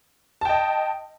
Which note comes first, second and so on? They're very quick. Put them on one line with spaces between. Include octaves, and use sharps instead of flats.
A5 G5 D#5